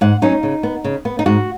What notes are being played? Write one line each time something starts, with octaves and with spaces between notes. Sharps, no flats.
G#2 F#5
F#3 C#4 D#4
C#3
B3
C#3
B3
D#4
G#2 F#4